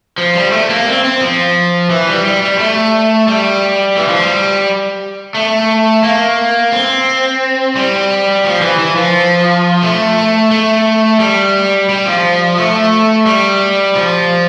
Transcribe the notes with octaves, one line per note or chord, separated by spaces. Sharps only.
F3
G3
A3
A#3
C4
C4
F3
E3
G3
G3
G3
A3
G3
E3
F3
G3
A3
A#3
C4
G3
F3
E3
E3
F3
A3
A3
G3
G3
F3
A3
G3
F3